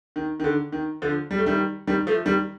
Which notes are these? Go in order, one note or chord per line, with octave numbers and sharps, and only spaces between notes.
D#3
D#3
D3
D#3
D3 F3
G3
A3
D#3 G3
D#3 G3
F3 A3
D#3 G3